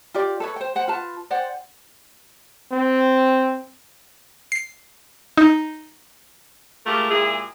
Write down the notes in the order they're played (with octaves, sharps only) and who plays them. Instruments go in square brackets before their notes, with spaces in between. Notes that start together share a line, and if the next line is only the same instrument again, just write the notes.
[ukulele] F4 G4 D5
A4 B4 C#5
C5 G5
C5 F#5 G5
F4 B4 A5
C5 D5 F#5 G5
[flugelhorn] C4
[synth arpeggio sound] C7
D#4
[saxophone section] G#3 A3 F4 G4 A4 A#4
A#2 G#3 E4 G4 G#4